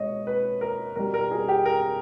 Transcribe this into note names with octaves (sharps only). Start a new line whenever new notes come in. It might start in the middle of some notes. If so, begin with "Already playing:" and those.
Already playing: B2 G#3 C#5 D#5
B4
A#4
B2 G3 A#4
A#4
G#4
G4
A#4